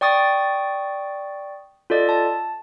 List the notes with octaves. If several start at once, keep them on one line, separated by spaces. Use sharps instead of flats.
D5 G5 C#6 D#6 A6
F4 A4 D5 D#5
A5